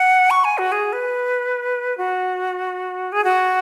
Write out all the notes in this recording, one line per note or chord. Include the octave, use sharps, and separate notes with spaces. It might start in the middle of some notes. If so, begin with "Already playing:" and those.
Already playing: F#5
C#6
G#5
F#4
G#4
B4
F#4
G#4
F#4